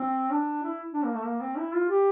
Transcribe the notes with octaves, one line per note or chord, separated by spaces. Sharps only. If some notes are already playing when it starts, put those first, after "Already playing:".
Already playing: C4
D4
E4
D4
A#3
A3
A#3
C4
E4
F4
G4